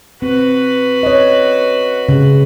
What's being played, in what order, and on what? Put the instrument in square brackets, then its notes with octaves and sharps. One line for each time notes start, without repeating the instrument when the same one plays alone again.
[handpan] C4 [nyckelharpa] F#4 B4
[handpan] C#5 D#5
C#3